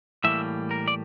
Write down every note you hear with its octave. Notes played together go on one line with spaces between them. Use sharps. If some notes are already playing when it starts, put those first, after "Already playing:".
A2 E3 G3 A#3 E5
A#4
D5